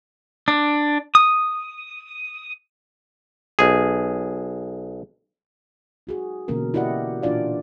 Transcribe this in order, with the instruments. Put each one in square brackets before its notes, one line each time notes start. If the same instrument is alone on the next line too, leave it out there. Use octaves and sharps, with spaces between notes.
[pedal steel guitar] D4
D#6
[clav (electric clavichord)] B1 G#4
[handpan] D#4 F#4 G#4
B2 D3 E3 A#3 C#4 A#4
E4 F#4 G4 D5 D#5 F#5
A#2 E3 D4 F4 D5 F5